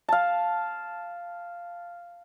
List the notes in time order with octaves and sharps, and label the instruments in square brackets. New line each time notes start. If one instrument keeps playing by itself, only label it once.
[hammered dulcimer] F5 A5